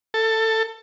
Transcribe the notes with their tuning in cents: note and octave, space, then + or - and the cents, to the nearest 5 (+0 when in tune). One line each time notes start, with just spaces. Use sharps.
A4 +15